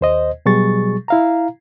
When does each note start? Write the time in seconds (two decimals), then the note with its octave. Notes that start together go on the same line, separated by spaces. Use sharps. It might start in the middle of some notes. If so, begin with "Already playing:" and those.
0.01 D#2 C5 D#5
0.46 B2 F#3 G3 G#4 C#6 A6
1.08 E4 F5 A#5